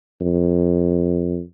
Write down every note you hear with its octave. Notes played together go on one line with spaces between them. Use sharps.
F2